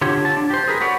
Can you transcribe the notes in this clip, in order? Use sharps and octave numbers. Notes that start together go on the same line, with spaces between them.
D3 F4 G4 C#5
A5
D4
G4 C5
G#4 A#4 B4
F#4 B4 C#5 D5